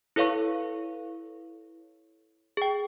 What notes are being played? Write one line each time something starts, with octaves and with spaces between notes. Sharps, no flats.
E4 A4 B4 C#5 F5 C#6
G#4 G5